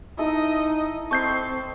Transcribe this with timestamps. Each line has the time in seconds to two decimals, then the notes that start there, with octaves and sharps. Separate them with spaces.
0.18 D#4 E4 A4 D#5
1.11 C4 A4 D#5 G5 A5 C#6 G6 C7